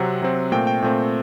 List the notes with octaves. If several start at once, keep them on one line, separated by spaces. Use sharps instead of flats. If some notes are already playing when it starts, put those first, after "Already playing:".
Already playing: C3 F#3 C4 F#5
C3 F#3 C4
A#2 A3 C4 G5
G5
A#2 A3 C4 G5